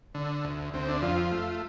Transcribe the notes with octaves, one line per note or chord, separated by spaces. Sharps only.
D3
D2
D2 C4
D4
F2 F4
A3